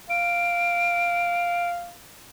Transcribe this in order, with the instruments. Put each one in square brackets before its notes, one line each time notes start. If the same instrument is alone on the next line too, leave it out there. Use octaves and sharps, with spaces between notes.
[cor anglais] F5 [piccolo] D7